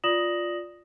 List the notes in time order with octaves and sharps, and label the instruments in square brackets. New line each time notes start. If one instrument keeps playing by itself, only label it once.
[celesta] F4 D5 D#6 A#6 E7 F#7